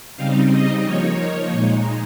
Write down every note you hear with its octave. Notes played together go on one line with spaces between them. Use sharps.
C#3 G3 C4 D#4 F5
D#5
F3 A#3 D#4 C#5
A#2 G#3 D#4